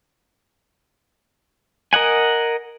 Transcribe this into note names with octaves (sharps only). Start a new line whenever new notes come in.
A#4 D#5 F#5 G#5